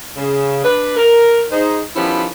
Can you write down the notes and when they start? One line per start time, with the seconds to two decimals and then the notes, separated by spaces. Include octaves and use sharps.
0.16 C#3
0.64 D4 B4
0.96 A#4
1.52 D#4 G#4 C5
1.96 D#3 F3 B3 C#4 E4 G4